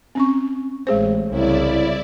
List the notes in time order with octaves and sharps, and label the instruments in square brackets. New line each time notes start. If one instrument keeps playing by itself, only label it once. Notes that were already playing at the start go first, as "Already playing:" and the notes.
[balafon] C4 C#4 C#6
[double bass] A1 A2 [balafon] G#3 G#4 C5
[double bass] C2 C#3 [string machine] E4 D5